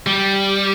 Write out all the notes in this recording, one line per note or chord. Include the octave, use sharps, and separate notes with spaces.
G3